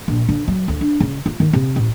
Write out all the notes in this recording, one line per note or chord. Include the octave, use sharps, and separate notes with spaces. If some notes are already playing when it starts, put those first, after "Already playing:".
A#1
D3
F#3
D2
D4
C#3
F4
D#3
C3
A1